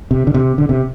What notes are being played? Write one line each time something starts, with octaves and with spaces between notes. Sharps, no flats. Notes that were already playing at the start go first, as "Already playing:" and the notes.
C3
D3
C3
D3
C3